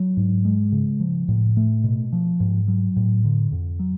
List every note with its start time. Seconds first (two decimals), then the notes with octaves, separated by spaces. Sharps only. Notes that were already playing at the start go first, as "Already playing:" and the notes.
Already playing: F#3
0.17 G#2
0.45 G#3
0.72 C#3
1.00 F3
1.28 A2
1.57 A3
1.84 B2
2.13 F3
2.40 G#2
2.68 F#3
2.96 A2
3.24 D3
3.52 F2
3.79 F#3